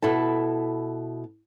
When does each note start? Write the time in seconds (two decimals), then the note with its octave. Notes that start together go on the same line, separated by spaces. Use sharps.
0.02 B2 E4 A4 A5